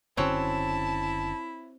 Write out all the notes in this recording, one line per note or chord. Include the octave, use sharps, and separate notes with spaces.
F#1 D3 C4 C#4 E4 F#4 C#5 A5